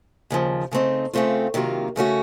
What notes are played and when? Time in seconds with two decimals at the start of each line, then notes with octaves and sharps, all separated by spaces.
0.30 D#2 C#3 F3
0.71 C#3 A3 C4 D#4
1.14 C#3 A3 C4 F4
1.54 C3 D#3 F#3 A#3 F4
1.96 C#3 A3 C#4 F#4